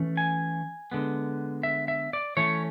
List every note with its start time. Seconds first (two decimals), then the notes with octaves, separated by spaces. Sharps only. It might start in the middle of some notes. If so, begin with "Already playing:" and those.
Already playing: E3 A3 C#4
0.17 G#5
0.92 D3 G#3 B3
1.63 E5
1.88 E5
2.13 D5
2.37 E3 A3 C#4 C#5